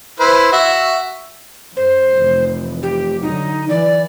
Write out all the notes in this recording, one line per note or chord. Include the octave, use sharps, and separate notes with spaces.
E4 B4 C5
F#4 E5
F#2 C5
F1 E3
G4
D3 F#3 D#4
E3 D5